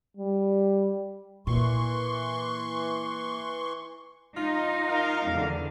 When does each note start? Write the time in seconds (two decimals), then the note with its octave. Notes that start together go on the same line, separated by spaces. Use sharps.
0.17 G3
1.47 A#2 E3 C6 C#6
4.37 D#4 F4
4.88 A#4 F5
5.28 E2 D3